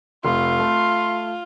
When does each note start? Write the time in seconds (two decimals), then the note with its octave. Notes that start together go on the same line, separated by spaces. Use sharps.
0.25 F1 F4 C6
0.60 A3